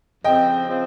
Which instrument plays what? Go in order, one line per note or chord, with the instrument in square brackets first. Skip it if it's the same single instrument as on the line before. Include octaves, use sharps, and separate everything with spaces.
[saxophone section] F2 C#3 F3 C4 [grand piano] D#5 G5
[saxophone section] C#3 F3 C4